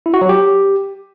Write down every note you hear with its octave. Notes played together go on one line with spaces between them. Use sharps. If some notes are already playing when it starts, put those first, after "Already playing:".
E4
F#4
F#3
G4